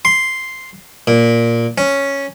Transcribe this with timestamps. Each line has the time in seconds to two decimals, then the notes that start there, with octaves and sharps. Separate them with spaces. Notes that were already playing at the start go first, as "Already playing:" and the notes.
0.05 C6
1.07 A#2
1.78 C#4